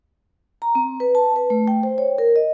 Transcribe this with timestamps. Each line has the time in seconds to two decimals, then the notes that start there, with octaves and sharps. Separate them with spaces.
0.62 A#5
0.75 C4
1.00 B4
1.15 A5
1.36 B4
1.50 A3
1.68 G5
1.83 C5
1.98 C#5
2.18 A#4
2.36 D#5